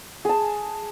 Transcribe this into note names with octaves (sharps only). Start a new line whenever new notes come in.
G#4 A5